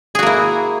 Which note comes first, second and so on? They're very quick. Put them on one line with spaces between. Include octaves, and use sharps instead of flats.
G#4 F#4 A#3 E4